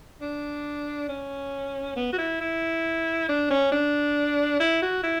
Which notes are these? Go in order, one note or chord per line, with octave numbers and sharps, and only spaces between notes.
D4
C#4
B3
F#4
E4
E4
D4
C#4
D4
E4
F#4
E4